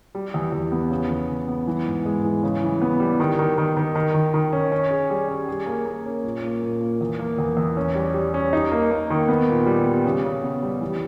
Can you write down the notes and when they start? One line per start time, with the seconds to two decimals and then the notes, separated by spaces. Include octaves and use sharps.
0.15 G3
0.34 E2
0.52 E2
0.72 B3
0.90 C#3
1.10 E2
1.29 C#3
1.48 B3
1.67 E3
1.87 G#2
2.06 G#3
2.24 E3
2.43 C#3
2.63 E3
2.81 B3
3.00 G3
3.20 D#3
3.39 D#3
3.58 D#3
3.77 D#3
3.96 D#3
4.14 D#3
4.34 D#3
4.53 C#4
4.72 C#4
4.91 G#4
5.10 G3
5.28 C#4
5.49 G#4
5.66 A#3
5.86 A#3
6.06 C#4
6.24 A#2
6.44 A#3
6.62 A#2
6.81 A#3
7.01 E2
7.19 A#3
7.38 E2
7.57 E2
7.77 C#4
7.95 G3
8.14 G3
8.34 C#4
8.53 D#4
8.72 A#3
8.91 A#3
9.10 D#3
9.28 B3
9.48 A#2
9.66 G3
9.85 B3
10.05 C#3
10.24 C#3
10.43 B3
10.63 G3
10.81 E3